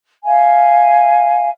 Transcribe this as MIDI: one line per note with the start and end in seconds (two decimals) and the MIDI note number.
0.24 1.49 76
0.24 1.49 77
0.24 1.49 80